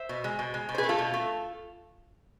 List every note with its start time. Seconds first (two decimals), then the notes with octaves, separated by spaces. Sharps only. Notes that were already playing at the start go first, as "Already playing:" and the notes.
Already playing: C5 E5
0.09 B2
0.24 G#3
0.39 B2
0.54 G#3
0.69 B2
0.75 C5
0.78 G#4 B4
0.84 A3
0.89 F4 A4
0.99 B2
1.14 A3